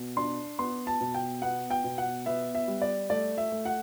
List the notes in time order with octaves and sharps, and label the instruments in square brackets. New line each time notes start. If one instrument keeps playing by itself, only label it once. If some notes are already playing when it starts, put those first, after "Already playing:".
Already playing: [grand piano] B2
D4 C6
B3 C6
A5
B2
G5
B3 F#5
G5
B2
F#5
B3 E5
E5
G3
D5
A3 D5
E5
A3
F#5